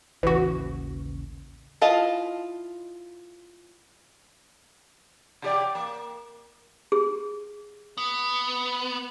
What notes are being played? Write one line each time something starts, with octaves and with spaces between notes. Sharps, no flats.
A1 D#2 C#3 E3 F#4
E4 F4 D#5 A5
C3 G4 D5
A#3
G#4
B3